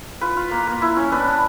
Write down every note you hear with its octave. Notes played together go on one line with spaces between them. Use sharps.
F4 B4
F4
A#3
A#3
E4
C#4
D4 B4
D4